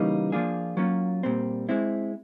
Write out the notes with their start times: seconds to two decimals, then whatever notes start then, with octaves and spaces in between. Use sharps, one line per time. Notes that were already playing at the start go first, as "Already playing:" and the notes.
Already playing: C#3 E3 G3 A#3 D#4
0.32 F3 A#3 D4 F4 G#4
0.77 F#3 A#3 C#4 F4
1.23 A#2 G3 C4
1.69 G#3 C4 E4